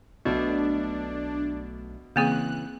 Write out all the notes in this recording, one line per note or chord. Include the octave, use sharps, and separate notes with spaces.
B1 B2 A3 D4
C#3 E3 A#3 C4 G#4 F#6